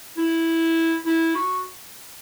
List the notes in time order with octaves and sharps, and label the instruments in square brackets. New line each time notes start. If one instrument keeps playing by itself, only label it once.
[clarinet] E4
E4
F#4